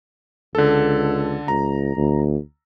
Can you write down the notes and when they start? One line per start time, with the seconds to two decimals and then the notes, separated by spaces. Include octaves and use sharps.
0.55 C#2 D3 A4
1.48 C#2 A#5
1.97 D2